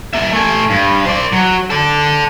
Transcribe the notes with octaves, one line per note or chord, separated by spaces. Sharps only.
A#3 E5
A3 G#5
G2
C5 D5
F#3
A4 D5